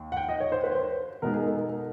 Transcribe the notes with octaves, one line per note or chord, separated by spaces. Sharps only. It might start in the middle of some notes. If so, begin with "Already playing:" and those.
Already playing: D#2
F#5
G5
D#5
C#5
C5
B4
C#5
C5
B2 G#3 B3 D#4 A#4
G#4
A4
A#4
A#4